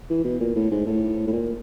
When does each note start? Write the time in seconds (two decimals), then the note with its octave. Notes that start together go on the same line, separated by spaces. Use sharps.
0.10 E3
0.24 B2
0.40 A#2
0.56 A2
0.71 G#2
0.86 A2
1.27 A2
1.32 A#2